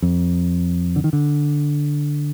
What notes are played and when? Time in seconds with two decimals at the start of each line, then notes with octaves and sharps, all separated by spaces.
0.02 F2
0.96 D3
1.04 D#3
1.13 D3